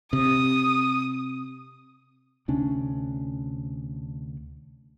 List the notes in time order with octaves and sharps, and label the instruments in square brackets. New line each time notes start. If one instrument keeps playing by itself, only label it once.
[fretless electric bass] C3 [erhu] D#6
[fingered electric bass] D2 C3 C#4 D4